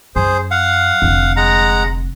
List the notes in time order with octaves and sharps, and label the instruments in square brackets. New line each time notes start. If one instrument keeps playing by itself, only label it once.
[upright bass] F#2 [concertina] G#4 C5
[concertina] F5 F#5
[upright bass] F1 D3
[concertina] G#3 F#5 A#5